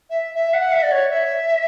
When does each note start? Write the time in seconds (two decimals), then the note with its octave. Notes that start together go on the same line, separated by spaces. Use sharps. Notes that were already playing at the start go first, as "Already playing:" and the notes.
0.10 E5
0.35 E5
0.54 F#5
0.72 E5
0.83 D5
0.92 C#5
1.10 E5